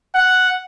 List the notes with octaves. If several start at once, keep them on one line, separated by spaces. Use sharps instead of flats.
F#5